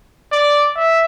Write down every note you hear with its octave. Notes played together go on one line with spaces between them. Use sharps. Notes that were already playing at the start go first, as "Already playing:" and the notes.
D5
E5